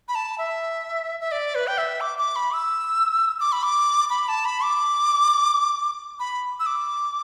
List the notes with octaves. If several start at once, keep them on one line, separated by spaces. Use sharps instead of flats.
B5
A5
E5
E5
D5
B4
G5
E5
D6
D6
B5
E6
D6
B5
D6
B5
A5
B5
D6
B5
E6
D6